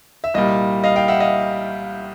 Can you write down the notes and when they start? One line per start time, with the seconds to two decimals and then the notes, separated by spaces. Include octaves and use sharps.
0.24 E5
0.34 C2 A#2 G3 D#5
0.84 D#5 F5
0.96 F5 G5
1.08 E5 F#5
1.20 D#5 F5